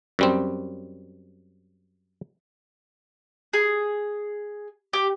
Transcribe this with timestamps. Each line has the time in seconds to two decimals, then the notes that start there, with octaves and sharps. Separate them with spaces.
0.19 F#2 G3 C4
3.53 G#4
4.93 G4